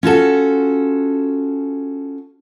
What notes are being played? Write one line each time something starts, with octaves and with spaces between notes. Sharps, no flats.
C#4 F4 F#4 A4